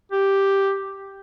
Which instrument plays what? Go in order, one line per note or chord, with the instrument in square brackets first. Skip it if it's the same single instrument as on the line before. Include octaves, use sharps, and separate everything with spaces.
[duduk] G4